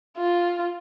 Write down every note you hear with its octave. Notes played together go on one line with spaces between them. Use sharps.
F4